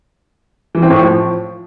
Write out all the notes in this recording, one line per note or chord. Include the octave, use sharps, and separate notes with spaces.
E3
C4
A2
F3